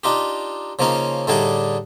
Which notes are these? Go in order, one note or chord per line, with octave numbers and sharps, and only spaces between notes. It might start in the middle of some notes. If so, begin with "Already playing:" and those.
D4 D#4 F4 G4
C#3 F3 A#3 C#4 D#4
A2 D3 G3 D4 D#4 G#4